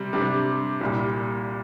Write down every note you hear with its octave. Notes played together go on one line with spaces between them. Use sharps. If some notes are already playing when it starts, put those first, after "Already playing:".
Already playing: C3 G3
C3 G3 D4
C2 A#2 G3